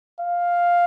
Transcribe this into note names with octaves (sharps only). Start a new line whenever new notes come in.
F5